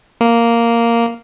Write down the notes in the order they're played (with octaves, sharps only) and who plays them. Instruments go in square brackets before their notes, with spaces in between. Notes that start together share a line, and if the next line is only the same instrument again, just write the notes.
[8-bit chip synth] A#3